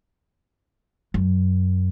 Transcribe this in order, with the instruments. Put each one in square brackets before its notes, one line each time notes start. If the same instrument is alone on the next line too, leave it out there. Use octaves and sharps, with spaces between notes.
[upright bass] F#2